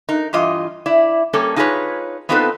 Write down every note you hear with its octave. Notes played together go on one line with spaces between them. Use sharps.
D#4 A#4
G2 E3 F4 D#5
E4 D5
G3 A#3 C#4 A4 C#5
D#4 F4 G#4 A4 B4 C#5
B3 C4 D#4 F4 A4 B4